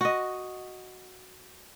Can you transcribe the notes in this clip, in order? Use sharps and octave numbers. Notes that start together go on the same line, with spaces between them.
F#4 D#5